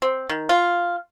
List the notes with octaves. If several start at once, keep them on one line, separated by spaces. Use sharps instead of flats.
C4
D#3
F4